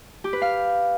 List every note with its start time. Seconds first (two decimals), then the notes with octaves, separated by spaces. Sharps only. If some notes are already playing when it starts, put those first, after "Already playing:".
0.24 G4
0.33 B4
0.42 F5